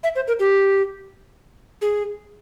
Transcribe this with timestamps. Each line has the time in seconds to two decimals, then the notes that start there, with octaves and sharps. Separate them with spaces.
0.04 E5
0.16 C5
0.28 A#4
0.40 G4
1.82 G#4